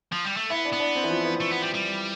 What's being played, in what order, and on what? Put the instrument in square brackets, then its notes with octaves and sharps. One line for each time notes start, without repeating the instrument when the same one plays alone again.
[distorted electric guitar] F3
G3
A3
[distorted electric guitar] B3 [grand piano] E4
[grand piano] D4
[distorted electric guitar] B3
[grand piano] D4
C4
E3
F3
E3
[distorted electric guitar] A3
B3
G3
G3